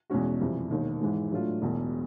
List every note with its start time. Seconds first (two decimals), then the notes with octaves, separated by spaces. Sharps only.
0.10 E2 B2 G#3 C#4 F#4
0.40 F2 C3 E3 G3
0.70 E1 D#2 D#3
1.01 G#2 E3 G#3
1.31 A2 F#3 A3 D4 F4
1.62 E1 E2 B2